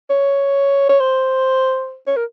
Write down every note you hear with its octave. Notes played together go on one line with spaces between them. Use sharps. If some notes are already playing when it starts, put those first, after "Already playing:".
C#5
C#5
C5
C#5
A#4